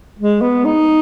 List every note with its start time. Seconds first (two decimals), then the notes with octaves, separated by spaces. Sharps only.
0.19 G#3
0.41 B3
0.65 D#4